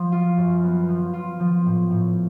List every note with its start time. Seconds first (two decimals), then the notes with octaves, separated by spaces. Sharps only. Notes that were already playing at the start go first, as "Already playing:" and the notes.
Already playing: F3
0.12 F4
0.37 F#2
0.63 B3
0.89 F3
1.13 F4
1.40 F3
1.66 A2
1.91 A2